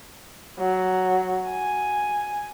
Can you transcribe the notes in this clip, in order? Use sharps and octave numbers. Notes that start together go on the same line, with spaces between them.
F#3
G#5